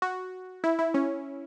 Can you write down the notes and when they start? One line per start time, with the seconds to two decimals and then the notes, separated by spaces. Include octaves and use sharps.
0.02 F#4
0.64 E4
0.79 E4
0.94 C#4